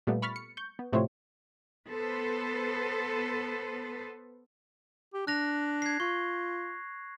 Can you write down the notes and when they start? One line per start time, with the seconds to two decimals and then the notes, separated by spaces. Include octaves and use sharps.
0.07 A#2 G3 A3 B3
0.22 B5 C#6 F6 A6 B6
0.36 C#7
0.57 C#6 G6
0.79 B3
0.93 A2 C3 F3 A3 C5 C#5
1.89 B3 A4 B4 C5
5.14 G4
5.27 D4 F#6 A#6 F7
5.82 G#6 C7
6.00 F4 C#6